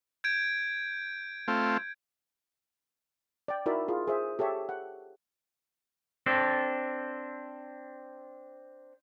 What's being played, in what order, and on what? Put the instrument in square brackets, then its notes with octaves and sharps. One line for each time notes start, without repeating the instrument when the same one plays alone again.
[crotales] G6 G#6 D7
[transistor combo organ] A3 C4 F4
[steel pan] D5 G5
D#4 E4 F#4 A#4 D5 E5
F4 G#4
G#4 C5 E5
G4 A4 C#5 E5
F#5
[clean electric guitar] C4 D4 A4